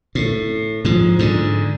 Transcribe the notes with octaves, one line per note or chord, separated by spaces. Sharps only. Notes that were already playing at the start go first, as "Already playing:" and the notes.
A2
G#2 F3
G#2 D3